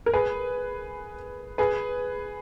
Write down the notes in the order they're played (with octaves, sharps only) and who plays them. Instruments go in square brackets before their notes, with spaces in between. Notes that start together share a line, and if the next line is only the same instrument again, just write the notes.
[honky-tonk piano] A#4
G#4 B4
G#4 B4